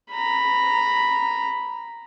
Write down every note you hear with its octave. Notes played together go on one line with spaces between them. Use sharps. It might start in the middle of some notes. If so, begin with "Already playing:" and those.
A#5 B5